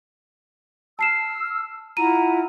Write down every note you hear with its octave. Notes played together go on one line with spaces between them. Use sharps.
A5 E6 F6 C7 E7
E4 F4 F#5 A#5 D#7